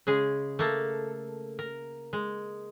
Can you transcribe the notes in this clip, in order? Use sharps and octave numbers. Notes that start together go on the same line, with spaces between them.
C#3 G#3 G#4
A3 A#3 A4
A#4
G#3